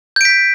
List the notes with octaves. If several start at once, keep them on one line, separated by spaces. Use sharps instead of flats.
G6 B6 D7